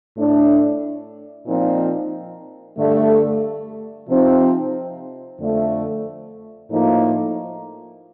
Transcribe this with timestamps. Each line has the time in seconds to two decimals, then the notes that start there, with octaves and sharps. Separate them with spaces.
0.16 A2 A3 D4
1.47 A#2 F3 C4 D#4
2.77 G2 D3 A3
4.08 C3 F3 C4 D#4
5.39 F2 D3 A3
6.70 A2 F3 A#3 D#4